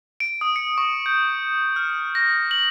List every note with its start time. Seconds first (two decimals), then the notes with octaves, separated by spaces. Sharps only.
0.20 D7
0.41 D#6
0.56 C#7
0.78 C#6
1.06 G6
1.76 F6
2.15 A#6
2.51 F#7